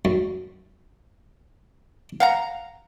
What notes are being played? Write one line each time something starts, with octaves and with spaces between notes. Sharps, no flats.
F#2
F5 F#5 A#5